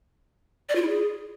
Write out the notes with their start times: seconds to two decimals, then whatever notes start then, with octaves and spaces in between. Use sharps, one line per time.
0.69 D5
0.76 F4
0.82 E4
0.88 G#4